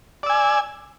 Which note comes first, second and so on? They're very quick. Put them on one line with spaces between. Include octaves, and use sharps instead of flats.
D5 E6 G#5